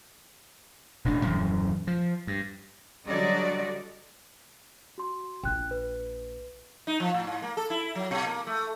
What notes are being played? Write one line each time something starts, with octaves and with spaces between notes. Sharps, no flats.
E1 A1 B2 D4
D#1 F#2 E3
F3
G2
D3 F#3 G3 F#4 D5 D#5
F#4 C6
A#1 A#3 G5 F#6
B4
D#4
F3
A2
G#2
A#3
A4
E4
F#3
B2
A#3
A3